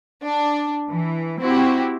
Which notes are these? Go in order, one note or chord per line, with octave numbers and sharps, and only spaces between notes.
D4
E3
C4 E4 F#4 G4